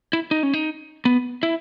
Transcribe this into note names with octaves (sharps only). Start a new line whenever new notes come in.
E4
D#4
C#4
D#4
B3
E4